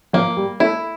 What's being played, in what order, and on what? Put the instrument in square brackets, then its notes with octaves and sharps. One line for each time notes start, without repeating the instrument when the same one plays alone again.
[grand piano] F3 [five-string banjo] A#3
[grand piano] G3
[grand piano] A3 [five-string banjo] E4